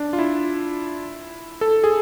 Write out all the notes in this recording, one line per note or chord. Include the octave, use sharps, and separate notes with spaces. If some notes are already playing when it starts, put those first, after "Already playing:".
Already playing: D4
F4
E4
A4
G#4